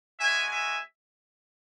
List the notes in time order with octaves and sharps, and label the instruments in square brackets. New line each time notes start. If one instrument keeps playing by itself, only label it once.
[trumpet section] G#3 C#4 F#4 E5 G#5
E5 G#5